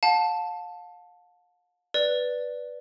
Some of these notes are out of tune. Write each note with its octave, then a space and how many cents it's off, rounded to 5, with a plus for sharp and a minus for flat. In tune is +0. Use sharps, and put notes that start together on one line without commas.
F5 +40 A5 +0
B4 +0 D5 +0